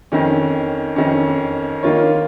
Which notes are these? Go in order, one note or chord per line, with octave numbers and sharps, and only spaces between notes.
F2 D#3 C#4
F2 D#3 C#4
D#3 A#3 F4 C#5